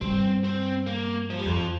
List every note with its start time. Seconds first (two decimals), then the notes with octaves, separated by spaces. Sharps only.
0.01 G2 C4
0.44 C4
0.87 A#3
1.30 F3
1.39 G3
1.46 F2 F3